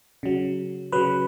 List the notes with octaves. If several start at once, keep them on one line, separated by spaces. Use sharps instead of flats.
C#3 F#3
C#3 F#3 B4